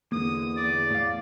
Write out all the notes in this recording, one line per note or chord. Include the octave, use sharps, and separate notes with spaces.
E2 D3 A#3 D#6
D5 D6
A2 F5